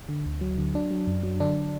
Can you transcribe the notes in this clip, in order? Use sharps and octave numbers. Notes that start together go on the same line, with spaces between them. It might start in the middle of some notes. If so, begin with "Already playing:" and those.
D3
D2
F#3
D3
F#3 D4
F#3
F#2
F#3
D3 D4